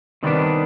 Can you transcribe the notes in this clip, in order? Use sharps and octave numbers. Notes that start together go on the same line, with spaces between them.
C3 D#3 G3 B3 D4